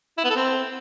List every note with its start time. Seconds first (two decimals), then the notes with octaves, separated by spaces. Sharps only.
0.18 E4
0.24 B3
0.30 A4
0.36 C4